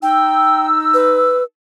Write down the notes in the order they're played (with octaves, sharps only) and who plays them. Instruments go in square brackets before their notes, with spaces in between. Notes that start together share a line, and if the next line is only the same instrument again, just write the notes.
[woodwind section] D#4 E6 [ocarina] G5
[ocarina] B4